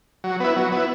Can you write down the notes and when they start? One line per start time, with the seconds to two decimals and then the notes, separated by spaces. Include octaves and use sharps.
0.24 F#3
0.40 B3 E4
0.56 F#3
0.72 B3 E4